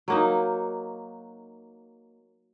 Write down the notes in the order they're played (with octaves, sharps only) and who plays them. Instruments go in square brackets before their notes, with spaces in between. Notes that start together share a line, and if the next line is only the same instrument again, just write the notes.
[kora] F#3 A#3 D#4